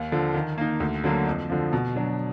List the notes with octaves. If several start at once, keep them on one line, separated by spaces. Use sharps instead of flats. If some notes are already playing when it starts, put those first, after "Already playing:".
Already playing: D#2
D3 F3
D#3
A#3 D#4
D2
D3 F#3 A#3
F2
D3 F3
B2
F#3 D4